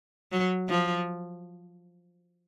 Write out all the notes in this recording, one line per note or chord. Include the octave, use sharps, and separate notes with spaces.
F#3
F3